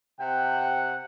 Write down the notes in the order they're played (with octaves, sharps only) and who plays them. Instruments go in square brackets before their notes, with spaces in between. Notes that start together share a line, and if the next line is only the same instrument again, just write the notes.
[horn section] C3 F#5 [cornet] G5